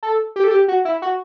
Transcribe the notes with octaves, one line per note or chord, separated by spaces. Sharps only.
A4
G4
A4
G4
F#4
E4
F#4